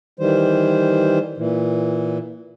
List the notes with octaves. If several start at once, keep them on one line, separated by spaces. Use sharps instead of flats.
D#3 E3 G3 C5
A#2 E3